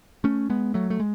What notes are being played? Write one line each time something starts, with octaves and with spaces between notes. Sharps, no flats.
A3 C#4
G#3 B3
F#3 A3
A3
G#3